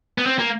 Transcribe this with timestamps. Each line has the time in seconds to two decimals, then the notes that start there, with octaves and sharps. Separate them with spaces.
0.18 B3
0.26 C4
0.39 A#3